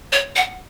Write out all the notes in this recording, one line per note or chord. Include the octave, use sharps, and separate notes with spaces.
C#5
F#5